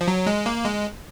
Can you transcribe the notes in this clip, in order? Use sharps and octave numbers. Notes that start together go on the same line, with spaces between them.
F3
F#3
G#3
A#3
G#3